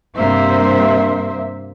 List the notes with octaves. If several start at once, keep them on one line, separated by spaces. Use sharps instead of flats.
G2 C3 A#3 C5 E5